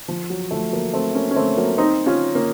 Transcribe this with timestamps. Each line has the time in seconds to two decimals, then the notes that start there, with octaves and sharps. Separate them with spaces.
0.08 F3
0.30 F#3
0.51 F3 A3
0.72 F#3 A#3
0.94 A3 C4
1.15 A#3 C#4
1.31 C#4
1.36 A3 C4
1.57 F#3 A#3
1.78 C4 D#4
2.06 C#4 F4
2.35 A#3 C#4